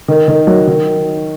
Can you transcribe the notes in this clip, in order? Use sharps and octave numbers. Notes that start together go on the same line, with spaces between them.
D#3
D#3
F#3
D#3